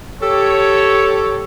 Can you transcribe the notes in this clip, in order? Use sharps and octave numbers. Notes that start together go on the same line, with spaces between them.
G4 A4 C#5